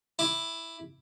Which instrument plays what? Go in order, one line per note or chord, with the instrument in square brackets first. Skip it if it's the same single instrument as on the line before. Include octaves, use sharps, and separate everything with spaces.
[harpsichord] E4 D6